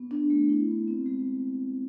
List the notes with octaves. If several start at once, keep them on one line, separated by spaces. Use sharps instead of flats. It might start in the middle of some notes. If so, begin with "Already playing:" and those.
Already playing: B3
D4
A3
E4
B3
C4
G#3